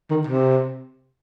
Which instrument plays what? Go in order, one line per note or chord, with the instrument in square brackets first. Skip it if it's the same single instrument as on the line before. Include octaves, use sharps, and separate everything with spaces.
[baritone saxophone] D#3
C3